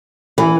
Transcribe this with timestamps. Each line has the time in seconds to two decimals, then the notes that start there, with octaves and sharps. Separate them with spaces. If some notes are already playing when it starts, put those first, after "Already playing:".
0.38 E3